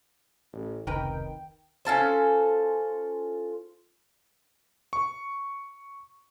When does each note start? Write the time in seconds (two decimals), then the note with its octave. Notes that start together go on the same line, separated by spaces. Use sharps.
0.53 A1
0.87 F1 C#2 C3 D#3 D#4 A#4 B4 G5
1.85 C#4 F4 A4 C5
4.93 C#6